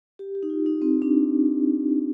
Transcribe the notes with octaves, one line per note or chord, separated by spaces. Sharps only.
G4
G4
D#4
F4
D#4
C4
D4